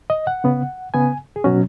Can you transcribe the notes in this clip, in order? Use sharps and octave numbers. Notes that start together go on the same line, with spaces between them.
D#5
F#5
C#3 B3
C#3 B3 G#5
G#4
B2 F#3 C#4 F#4